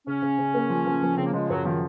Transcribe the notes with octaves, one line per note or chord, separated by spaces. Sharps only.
C#3 C#4
C#3
C#3
A#3
F3
F3
F3
C#3 C4
A#3
F3 G#3
F#2 F#3
D#3 F3